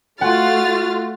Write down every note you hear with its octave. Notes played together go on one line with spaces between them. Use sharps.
A3 F4 F#4 F#5 F6 A6